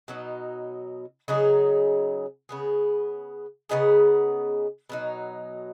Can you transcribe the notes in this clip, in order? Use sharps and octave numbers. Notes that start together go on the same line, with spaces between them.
B2 F#3 D#4
C#3 F#3 D#4 G#4
C#3 B3 G#4
C#3 B3 D#4 G#4
B2 F#3 D#4